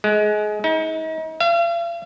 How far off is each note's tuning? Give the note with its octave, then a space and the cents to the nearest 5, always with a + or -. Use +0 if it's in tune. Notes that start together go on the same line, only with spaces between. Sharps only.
G#3 +25
D#4 +40
F5 -45